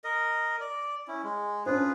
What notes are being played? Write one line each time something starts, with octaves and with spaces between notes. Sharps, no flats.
A#4 D#5
D5
C#4 E4
G#3
C#4 D4 F4 G#4 B4 C5